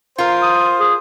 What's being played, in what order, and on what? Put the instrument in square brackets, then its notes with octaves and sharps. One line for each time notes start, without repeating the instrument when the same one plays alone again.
[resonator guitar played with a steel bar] F4 A#4 [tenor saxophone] C5
[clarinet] D#6
G#4